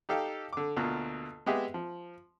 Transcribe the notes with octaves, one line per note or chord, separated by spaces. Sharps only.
D#4 G4 A4 F5 G5
D3 D6
D2 B2 A#3 F4
G#3 B3 G4 G#4 E5
F3